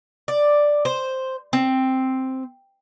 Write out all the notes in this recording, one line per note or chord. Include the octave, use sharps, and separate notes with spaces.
D5
C5
C4